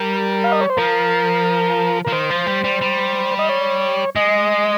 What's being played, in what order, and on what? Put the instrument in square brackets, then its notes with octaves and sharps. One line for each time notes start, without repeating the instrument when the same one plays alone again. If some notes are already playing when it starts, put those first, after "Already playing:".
Already playing: [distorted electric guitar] G3 [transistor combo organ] A#4
[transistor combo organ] F5
D#5
C#5
C5
[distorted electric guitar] F3 [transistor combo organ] A#4
[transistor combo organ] A#4
[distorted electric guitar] F3
[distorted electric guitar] D#3 [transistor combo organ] C5
[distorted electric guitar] F3
G3
G3
G3
[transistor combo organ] D#5
C#5
[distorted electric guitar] G#3 [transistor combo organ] D#5